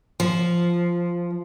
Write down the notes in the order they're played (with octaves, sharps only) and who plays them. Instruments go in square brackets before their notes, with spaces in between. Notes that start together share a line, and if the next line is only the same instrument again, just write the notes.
[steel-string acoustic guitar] F3